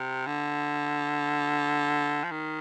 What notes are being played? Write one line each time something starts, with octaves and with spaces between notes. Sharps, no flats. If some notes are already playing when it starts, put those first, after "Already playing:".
Already playing: C3
D3
F3
D#3